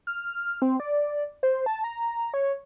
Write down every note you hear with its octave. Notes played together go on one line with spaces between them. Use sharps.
F6
C4
D5
C5
A5
A#5
C#5